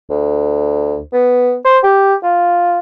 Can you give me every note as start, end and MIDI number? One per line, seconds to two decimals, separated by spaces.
0.10 1.01 38
1.13 1.56 59
1.65 1.78 72
1.83 2.14 67
2.23 2.79 65